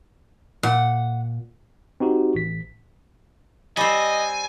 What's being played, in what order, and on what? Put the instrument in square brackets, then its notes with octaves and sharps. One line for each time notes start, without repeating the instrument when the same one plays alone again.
[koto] A#2 [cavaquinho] F#5
[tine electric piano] C4 D#4 F#4 G4
A1 B6
[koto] G3 C4 [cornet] D#5 [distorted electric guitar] G#5